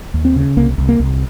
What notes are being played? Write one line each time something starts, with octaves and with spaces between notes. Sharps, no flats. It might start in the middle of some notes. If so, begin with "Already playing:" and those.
D#2
C4
C#3
C2 A#3
C2
A#3
C2